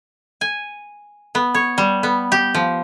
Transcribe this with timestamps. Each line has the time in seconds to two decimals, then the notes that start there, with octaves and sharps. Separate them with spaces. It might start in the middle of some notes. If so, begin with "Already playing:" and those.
0.41 G#5
1.35 B3
1.54 C#5
1.78 G3
2.03 B3
2.32 G4
2.54 F3